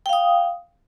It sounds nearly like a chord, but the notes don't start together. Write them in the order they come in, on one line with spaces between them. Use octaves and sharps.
G5 F5 D#6